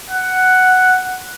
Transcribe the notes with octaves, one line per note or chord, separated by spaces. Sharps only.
F#5